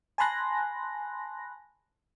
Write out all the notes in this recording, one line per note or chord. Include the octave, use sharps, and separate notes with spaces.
G#5 A5 B5 C6 F#6 A#6